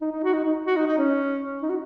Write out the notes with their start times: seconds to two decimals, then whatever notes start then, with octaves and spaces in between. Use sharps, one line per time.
0.01 D#4
0.12 D#4
0.24 F#4
0.34 D#4
0.44 D#4
0.66 F#4
0.77 D#4
0.87 D#4
0.98 C#4
1.62 D#4
1.70 F#4